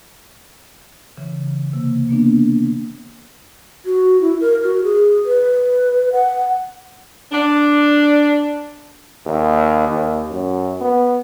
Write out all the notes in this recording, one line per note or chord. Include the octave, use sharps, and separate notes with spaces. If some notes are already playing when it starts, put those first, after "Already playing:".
C#3 E3
C3 A#3
A#3 B3 D4
F#4
E4
A#4
F#4
G#4
B4
F#5
D4
D#2
D#2
F#2
B3